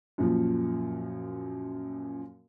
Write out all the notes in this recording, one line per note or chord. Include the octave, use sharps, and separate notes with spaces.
F#2 A#2 F3